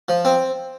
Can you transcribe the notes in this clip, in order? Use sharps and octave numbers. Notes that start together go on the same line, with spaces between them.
F3
C4